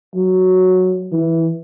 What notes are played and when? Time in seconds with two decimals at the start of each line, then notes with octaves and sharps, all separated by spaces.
0.14 F#3
1.11 E3